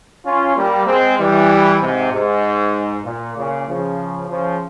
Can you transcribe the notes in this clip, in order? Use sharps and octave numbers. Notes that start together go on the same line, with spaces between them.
C#4 F4
G3 A#3
G#3 C4
E3 G3
G#2 C3
G#2
A#2
A#2 C#3
C#3 F3
C#3 F3